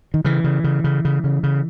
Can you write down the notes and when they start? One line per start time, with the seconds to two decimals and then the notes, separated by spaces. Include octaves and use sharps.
0.14 D#3
0.25 C#3 E3
0.44 C#3
0.64 C#3
0.84 C#3
1.05 C#3
1.24 C#3
1.43 C#3